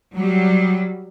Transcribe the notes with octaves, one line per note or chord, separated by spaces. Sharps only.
F#3 G3